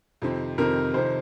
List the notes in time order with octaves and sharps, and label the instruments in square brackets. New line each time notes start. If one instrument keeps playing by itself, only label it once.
[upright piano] F2 C3 D#3 C4
[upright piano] F2 C3 D#3 C4 [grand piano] A#4
[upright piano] F2 C3 D#3 [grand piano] C5